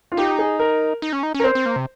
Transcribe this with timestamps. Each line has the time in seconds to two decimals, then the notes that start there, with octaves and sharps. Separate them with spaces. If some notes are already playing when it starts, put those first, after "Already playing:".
0.12 F4
0.17 D#4 G4
0.39 G#4
0.59 A#4
1.02 D#4
1.13 C#4
1.23 D#4
1.34 C#4
1.40 A#4
1.44 C4 C5
1.55 C4
1.66 A#3
1.76 C3